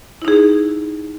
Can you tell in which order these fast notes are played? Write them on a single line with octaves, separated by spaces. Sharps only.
E4 D#4 G#4